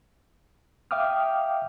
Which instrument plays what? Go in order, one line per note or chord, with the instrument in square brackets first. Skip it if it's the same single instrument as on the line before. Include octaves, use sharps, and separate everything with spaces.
[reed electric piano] E5 F5 G5 D6 D#6 F6